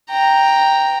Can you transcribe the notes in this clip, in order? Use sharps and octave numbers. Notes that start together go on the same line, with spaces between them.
G5 A#5